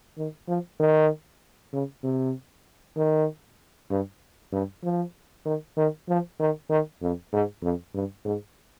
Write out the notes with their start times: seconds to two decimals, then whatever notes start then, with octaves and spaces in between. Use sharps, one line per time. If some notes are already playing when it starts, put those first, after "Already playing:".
0.18 D#3
0.48 F3
0.79 D#3
1.73 C#3
2.03 C3
2.97 D#3
3.90 G2
4.52 G2
4.83 F3
5.45 D#3
5.77 D#3
6.08 F3
6.40 D#3
6.69 D#3
7.02 F2
7.32 G#2
7.63 F2
7.94 G2
8.25 G#2